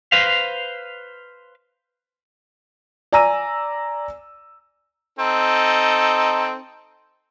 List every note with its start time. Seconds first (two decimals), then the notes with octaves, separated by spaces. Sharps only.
0.12 B4 C5 F5
3.13 D5 G#5 A#5 E6 D#7
5.19 C4 D#4 A4